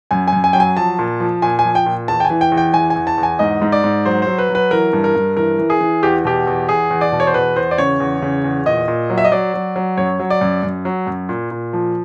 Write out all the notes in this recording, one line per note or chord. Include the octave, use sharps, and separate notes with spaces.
F#2 G#5
G#5
F#2
G#5
F#3 G5
G#5
F3 A5
A#2
F3
A#2 G#5
G#5
F3
G5
A#2
E2 A5
G5
G#5
E3
G5
E2
G5
E3 G#5
G#5
E2
A5
E2
G#5
G#2 D#5
G#2
D5
G#2
F#3 C5
F#3 C5
B4
F#3
B4
E3 A#4
G2
A#4
G2
E3 A#4
E3
G#4
E3
E2 G4
B2 G4
E2
E2 G#4
E2
D5
B2
C#5
C5
E2 B4
E2 C5
D5
C#3 C#5
E2
C#3
E2
A#2 D#5
A#2
F#3
E5
D#5
F#3 D5
F#3
F#3
F#2 C#5
F#3
D5
F#2
F#2
F#3
F#2
A#2
A#2
F3